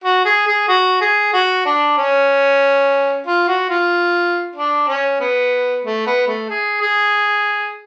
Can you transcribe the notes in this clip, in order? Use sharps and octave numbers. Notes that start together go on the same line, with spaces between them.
F#4
G#4
G#4
F#4
G#4
F#4
D4
C#4
F4
F#4
F4
D4
C#4
B3
A3
B3
A3
G#4
G#4